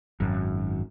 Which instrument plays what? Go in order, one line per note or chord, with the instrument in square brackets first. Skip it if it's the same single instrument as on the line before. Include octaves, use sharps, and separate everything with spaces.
[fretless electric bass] G#1 F#2